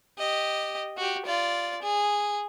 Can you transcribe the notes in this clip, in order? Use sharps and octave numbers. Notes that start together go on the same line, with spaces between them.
G4 D#5
F#4 G4
F4 D5
G#4